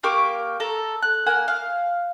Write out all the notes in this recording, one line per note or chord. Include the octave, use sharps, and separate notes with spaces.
A#3 G4 C#6 D6
A4 A#5
F#6
A#3 F#5 G#5
F5